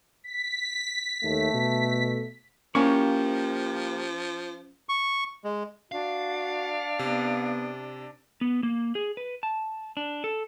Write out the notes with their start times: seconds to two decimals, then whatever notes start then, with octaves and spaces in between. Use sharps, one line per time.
0.24 B6
1.23 D#2 A3
1.54 B2
2.75 F3 A#3 C#4 E4 G4 C5 G#5 C#6
4.89 C#6
5.44 G#3
5.92 D4 F#4 F5
6.99 C3 B3
8.41 B3
8.63 A#3
8.95 G#4
9.17 B4
9.43 A5
9.97 D4
10.24 A4